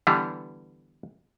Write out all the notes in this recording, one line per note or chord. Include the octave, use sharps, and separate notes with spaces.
D3 E3 G3 B3